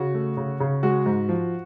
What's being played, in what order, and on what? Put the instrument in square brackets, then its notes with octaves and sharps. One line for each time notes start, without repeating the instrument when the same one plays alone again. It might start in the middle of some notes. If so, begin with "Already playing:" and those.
Already playing: [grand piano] C#3 F#4
A3
C#3
C#3
G#3 F#4
G#2
F3